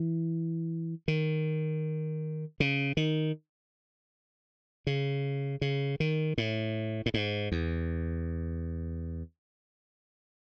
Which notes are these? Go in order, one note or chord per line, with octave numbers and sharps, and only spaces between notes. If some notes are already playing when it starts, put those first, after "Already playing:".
Already playing: E3
D#3
C#3
D#3
C#3
C#3
D#3
A2
A2
G#2
E2